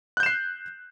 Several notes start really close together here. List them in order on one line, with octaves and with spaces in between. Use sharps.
F#6 G6 E7 C7